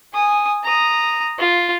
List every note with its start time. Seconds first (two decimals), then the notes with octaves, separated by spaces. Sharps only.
0.13 G#5 D#6
0.63 A#5 D#6
1.39 F4